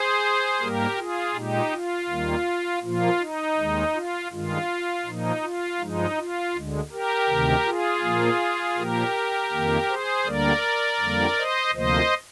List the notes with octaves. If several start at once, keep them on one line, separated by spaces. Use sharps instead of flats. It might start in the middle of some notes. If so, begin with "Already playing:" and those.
Already playing: G#4 C5
G#2 G3 A#3 G4 A#4
F4 G#4
A#2 G#3 D#4 G4
F4
D#2 D#3 G3 A#3
A#2 F3 A#3 F4
D#4
D#2 D#3 G#3
F4
G2 D#3 G#3 F4
A#2 F3 A#3 D#4
F4
G2 F3 G#3 D#4
F4
D2 D3 G#3
G4 A#4
D2 C3 D#3
F4 G#4
A#2 F3 A#3
A#2 F3 A#3 G4 A#4
F2 D#3 A#3
G#4 C5
D2 D3 G3 A#3 A#4 D5
F2 D3 G3 A#3
C5 D#5
D2 C3 F3 A#3 C5 D#5